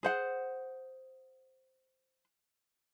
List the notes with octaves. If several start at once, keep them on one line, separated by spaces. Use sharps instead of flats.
G#4 C5 F#5